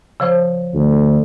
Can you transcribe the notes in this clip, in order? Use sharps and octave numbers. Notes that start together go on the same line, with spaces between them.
C#3 F3 C5
D2